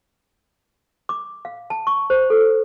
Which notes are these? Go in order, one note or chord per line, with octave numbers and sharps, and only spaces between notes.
D6
F5
A5
C#6
C5
A4